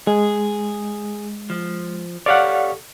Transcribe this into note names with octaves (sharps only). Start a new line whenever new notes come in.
G#3 G#4
F3
G4 A4 C#5 D5 F5 F#5